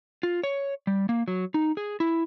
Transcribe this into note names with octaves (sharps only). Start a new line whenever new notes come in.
F4
C#5
G3
A#3
F#3
D#4
G#4
E4